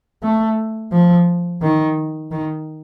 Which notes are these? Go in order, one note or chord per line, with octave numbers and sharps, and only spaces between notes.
A3
F3
D#3
D#3